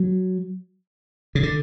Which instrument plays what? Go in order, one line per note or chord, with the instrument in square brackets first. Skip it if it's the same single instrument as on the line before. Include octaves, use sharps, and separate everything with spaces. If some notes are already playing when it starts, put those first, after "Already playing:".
Already playing: [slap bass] F#3
C#3
D3